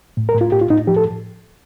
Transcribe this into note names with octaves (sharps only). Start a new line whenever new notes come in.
A2
A#4
A2
F4
A2 G4
F4
A2 D#4
F3 G4
A4